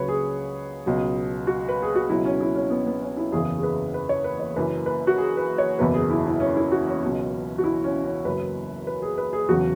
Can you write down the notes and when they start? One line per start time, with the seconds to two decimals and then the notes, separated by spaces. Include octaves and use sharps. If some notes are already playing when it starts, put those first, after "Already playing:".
Already playing: C#2 C#3 F#3 B4 C#5
0.08 G#4
0.86 C#2 B2 F#3
1.47 F#4
1.69 B4
1.82 G#4
1.95 F#4
2.09 C#2 B2 F#3 E4
2.25 C#4
2.41 E4
2.55 C#4
2.70 B3
2.87 B3
3.02 C#4
3.17 E4
3.32 F#1 E2 C#3 G#4
3.58 G#4
3.63 B4
3.94 B4
4.09 C#5
4.24 B4
4.40 C#5
4.56 F#1 F#2 E3 B4
4.86 B4
5.07 F#4
5.18 G#4
5.37 B4
5.58 C#5
5.79 F#1 E2 B2 F#3 B4
5.94 G#4
6.10 E4
6.26 E4
6.40 C#4
6.56 E4
6.72 F#4
6.87 C#4
7.03 C#2 B2 F#3
7.58 F#4
7.64 E4
7.84 C#4
8.05 C#4
8.25 F#1 F#2 F#3 B4
8.87 B4
9.02 G#4
9.18 B4
9.33 G#4
9.49 E1 E2 C#3 F#3 F#4